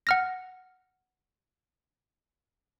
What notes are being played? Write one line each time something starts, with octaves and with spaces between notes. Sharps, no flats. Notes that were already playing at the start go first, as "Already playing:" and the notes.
F#5 F6 A#6